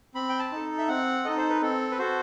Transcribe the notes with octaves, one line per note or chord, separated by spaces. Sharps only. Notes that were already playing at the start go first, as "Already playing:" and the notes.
C4 B5
G5
A5
D#4 A4
E5
C4 F#5
D#4 A4 D#5
C5
B4
C4 A4
B4
F#4 A4 C5